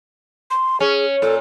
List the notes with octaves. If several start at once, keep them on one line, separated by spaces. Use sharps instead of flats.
C6
C#4 G#4
A#2 A4